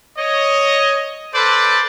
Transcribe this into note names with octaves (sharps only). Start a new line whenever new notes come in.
C#5 D#5
A4 B4 C5 D5